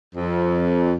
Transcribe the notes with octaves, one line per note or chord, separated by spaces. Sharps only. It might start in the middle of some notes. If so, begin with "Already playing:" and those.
F2